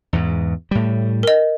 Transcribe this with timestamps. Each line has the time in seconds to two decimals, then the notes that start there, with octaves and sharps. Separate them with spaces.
0.13 E2 G#2
0.71 A2 G3
1.23 A#4 D#5